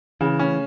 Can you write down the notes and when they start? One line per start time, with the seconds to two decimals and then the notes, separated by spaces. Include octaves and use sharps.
0.21 C#3 E3
0.39 C#4